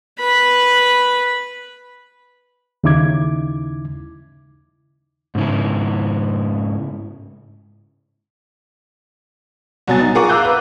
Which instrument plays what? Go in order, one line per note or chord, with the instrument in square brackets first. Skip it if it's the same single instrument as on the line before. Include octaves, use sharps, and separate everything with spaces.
[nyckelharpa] B4 B5
[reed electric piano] D#2 C#3 D#4 E4 D6 G#6
[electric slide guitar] G#2 C#3 E4
[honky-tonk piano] C2 B2 F#3 G#5 A6
D#4
F4 G#4 A#4 F#5 C#6 D6
F5 A#5 D6 E6 F#6 G6
B4